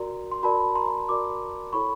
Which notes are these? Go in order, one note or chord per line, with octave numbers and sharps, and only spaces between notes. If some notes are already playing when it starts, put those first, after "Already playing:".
Already playing: F#4 A#4 D5 A#5 C6
C6
F#4 A#4 D5 A5 B5
A#5 C6
F#4 A#4 D5 C6 D6
E4 A4 C#5 B5 C#6